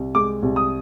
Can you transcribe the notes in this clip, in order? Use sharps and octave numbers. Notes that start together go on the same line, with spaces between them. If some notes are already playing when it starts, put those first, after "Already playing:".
Already playing: C2
G#3 D6
C2
D#6